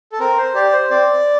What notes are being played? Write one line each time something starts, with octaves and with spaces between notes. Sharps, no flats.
A4
C4 A#4
C5
G4 D5
C5
C4 D5